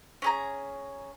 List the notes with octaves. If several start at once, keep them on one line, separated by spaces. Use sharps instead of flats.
C#4 G#4 A#5